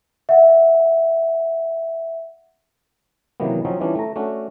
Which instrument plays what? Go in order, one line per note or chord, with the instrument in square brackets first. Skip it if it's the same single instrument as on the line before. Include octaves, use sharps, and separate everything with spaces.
[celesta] E5 F#5
[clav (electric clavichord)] C3 D#3 E3 F#3 A#3 B3
F3 F#3 C4 C#4 D#4
E3 F3 G3 C#4 D4
A3 A#5
A3 C#4 D4 F#4